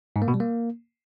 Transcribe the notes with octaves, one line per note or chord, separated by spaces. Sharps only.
G#2
A#3
B2
G3
A#3